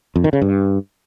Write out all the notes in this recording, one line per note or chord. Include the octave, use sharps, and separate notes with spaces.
F2
D#3
C#3
G2